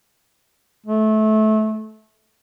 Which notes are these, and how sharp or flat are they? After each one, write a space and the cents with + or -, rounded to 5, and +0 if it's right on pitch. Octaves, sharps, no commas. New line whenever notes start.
A3 -25